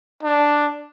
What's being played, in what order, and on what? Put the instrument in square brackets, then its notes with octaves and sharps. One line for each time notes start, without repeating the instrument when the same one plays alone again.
[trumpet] D4